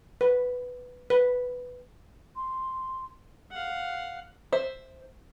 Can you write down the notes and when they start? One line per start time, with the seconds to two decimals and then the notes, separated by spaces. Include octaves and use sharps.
0.21 B4
1.10 B4
2.36 C6
3.51 F5 F#5
4.52 C5 E5